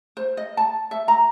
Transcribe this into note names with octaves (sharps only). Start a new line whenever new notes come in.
C5
D#5
A5
E5
A#5